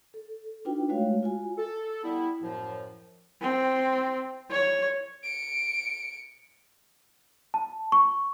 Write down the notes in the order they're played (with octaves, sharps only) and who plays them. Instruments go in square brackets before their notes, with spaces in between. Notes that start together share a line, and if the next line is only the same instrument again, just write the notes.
[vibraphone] A4
D4 D#4 F4 F#4 B4 G5
G#3 A3 F#4 C#5 F5
F4 F#4 G#5
[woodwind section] A4
G3 B3 E4
F#2 A2 F3
[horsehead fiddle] C4
C#5
[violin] C#7 D7
[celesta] A5
C#6